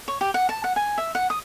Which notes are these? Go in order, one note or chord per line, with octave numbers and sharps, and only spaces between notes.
C#5
G4
F#5
A5
F#5
G#5
E5
F#5
D#6